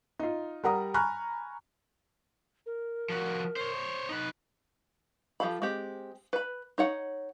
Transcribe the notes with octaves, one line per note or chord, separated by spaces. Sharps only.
D#4 F4
G3 A#4 F#5 A#5 D#6
G#5 A#5 B5 C#6 F6 F#6
A#4
F3 F#4
C5 C#5
D#4 B4
F3 G4 A4 F5 B5
G#3 C4 G4
B4 B5
D#4 C#5 F#5